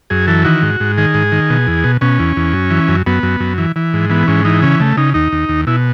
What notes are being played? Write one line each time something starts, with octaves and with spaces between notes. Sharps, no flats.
F#2 G#4
E3 A4
D#3 F#4
G#2
G#2
D#3 G#4
G#2
D#3
B2
E2
B2
B2 C#4
E2
E2
F#2
E3
F#2
F#2 B3
F#2
F#2
E3
E3
G#2
E3 B3
G#2 C#4
E3 D#4
C#3 C#4
C#3 A3
C#3 D#4
D#2 D#4
D#2
D#2
B2 E4